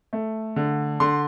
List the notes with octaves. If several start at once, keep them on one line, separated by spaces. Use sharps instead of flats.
A3
D3
D3 C6